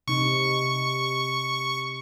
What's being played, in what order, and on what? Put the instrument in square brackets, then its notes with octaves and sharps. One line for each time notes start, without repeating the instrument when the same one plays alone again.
[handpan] C3 D#4 [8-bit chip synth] C#6